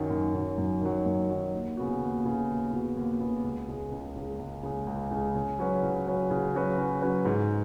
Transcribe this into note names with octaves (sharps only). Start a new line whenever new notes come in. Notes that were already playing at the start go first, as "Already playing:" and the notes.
Already playing: F#2 D#3 F#3
F#2
D#3 F#3
F#2
D#3 F#3
F#2
D#3 F#3
D#2
C#3 B3 F#4
D#2
C#3 B3 F#4
D#2
C#3 B3 F#4
D#2
C#3 B3 F#4
C#2
C#3 G#3
C#2
C#3 G#3
C#2
C#3 G#3
C#2
C#3 G#3
C#3
F#3 C#4 F#4 B4
C#3
F#3 C#4 F#4 B4
C#3
F#3 C#4 F#4 B4
C#3
F#3 C#4 F#4 B4
G#2